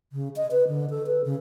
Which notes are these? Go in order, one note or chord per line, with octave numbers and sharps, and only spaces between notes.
C#3
D#5
B4
D3
A4
B4
C#3